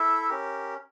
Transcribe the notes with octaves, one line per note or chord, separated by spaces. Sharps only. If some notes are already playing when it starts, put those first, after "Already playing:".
Already playing: E4 A4 E5
C#4 G4 A#4